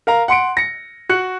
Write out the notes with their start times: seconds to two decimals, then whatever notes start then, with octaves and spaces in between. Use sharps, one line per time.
0.07 A#4 F5 A#5
0.28 F#5 C6 C#7 D7
0.57 A#6 C#7
1.09 F#4 F#6 C#7